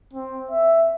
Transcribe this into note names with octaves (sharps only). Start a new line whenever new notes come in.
C4
E5